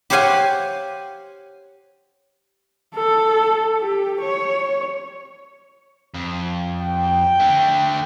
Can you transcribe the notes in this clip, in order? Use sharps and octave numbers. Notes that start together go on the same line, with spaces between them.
G4 C5 C#5 F5 F#5 G#5
A4
G4
C#5
F2
G5
D3 A3